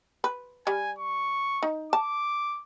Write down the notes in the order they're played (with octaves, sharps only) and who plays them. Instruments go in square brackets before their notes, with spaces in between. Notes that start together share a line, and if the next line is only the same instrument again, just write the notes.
[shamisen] B4
[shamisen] G3 [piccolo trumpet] G#5
[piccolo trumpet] C#6
[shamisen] D#4
[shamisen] A5 [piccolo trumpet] D6